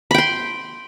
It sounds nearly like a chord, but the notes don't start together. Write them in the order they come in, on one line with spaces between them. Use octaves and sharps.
B5 G5 C6